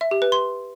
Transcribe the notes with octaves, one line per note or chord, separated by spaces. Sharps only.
E5
G4
B4
C6